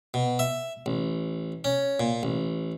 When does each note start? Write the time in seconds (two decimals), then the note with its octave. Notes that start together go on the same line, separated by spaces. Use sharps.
0.14 B2
0.39 E5
0.86 A1
1.64 C#4
2.00 A#2
2.23 A1